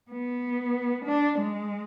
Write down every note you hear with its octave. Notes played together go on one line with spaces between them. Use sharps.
B3
D4
G#3